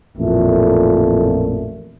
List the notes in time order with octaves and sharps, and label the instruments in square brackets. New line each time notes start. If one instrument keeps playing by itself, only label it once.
[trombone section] A1 F2 A#2 A3